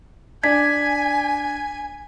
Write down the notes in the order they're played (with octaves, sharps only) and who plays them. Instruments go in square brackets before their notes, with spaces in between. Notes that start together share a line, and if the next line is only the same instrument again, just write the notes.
[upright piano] D4 D5 [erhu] G#5 [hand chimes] G#6 B6